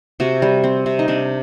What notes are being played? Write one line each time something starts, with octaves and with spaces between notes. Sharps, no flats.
C3 F#4
G3
C4
C3
D#4
C3 D4